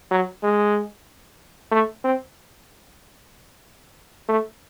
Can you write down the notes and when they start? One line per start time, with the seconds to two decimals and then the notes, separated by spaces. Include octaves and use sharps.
0.11 F#3
0.43 G#3
1.72 A3
2.04 C4
4.29 A3